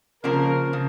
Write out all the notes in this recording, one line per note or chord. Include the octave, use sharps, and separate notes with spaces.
C#3 F3 A#3 A#4
C#3 F3